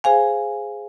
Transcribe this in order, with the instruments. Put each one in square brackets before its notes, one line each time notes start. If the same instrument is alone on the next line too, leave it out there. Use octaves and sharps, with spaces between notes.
[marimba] G#4 C5 F5 G#5